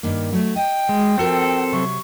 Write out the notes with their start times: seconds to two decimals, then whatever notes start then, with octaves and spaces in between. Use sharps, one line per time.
0.03 G2 D#3 A#3
0.33 F#3 A3
0.56 D#5 G5
0.89 G#3
1.18 F3 C4 F#4 A4 A#4
1.72 C3 F#3 C#6